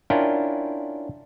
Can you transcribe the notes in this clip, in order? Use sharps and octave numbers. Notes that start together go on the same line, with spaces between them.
C#4 D4 E4 F4 A#4 G5